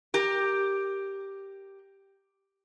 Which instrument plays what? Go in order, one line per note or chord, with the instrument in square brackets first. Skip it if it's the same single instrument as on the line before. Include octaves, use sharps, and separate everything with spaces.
[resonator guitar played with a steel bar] G4 A#4